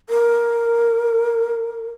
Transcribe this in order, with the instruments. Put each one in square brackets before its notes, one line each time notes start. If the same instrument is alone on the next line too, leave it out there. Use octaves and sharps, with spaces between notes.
[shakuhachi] A#4